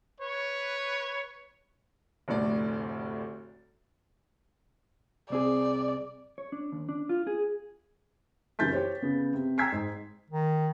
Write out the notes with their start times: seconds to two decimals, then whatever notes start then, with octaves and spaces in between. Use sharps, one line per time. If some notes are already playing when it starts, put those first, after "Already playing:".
0.21 B4 C#5
2.28 F1 D2 A2 D5
5.30 C2 C4 G#4 D5
6.38 C#5
6.52 D4
6.72 D#2
6.89 D4
7.09 F4
7.27 G#4
8.59 F#2 C#3 E3 G6 A6 B6
8.72 G4 C5 C#5
9.02 C#3 B3
9.34 C3
9.58 G5 A#5 E6 G#6 B6 C7
9.72 G#2
10.30 D#3